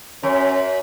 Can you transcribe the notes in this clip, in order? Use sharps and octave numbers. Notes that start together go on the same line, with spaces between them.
F#2 C#4